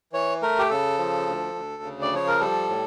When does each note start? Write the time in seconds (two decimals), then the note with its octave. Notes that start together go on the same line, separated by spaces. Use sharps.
0.13 E3 C#5
0.42 A3 A#4
0.59 G4
0.70 C#3 A4
0.99 F3
1.27 D2
1.55 D2
1.83 C#3
2.02 D5
2.12 F3 C#5
2.28 A#4
2.39 G3 A4
2.69 A2